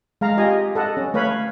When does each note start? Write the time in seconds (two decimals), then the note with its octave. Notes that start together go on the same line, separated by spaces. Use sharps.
0.21 G#3 F5 A#5
0.37 F4 G4 D#5 G#5
0.75 A4 D#5 F#5
0.97 C#4
1.14 A3 B4 C#5 F5 B5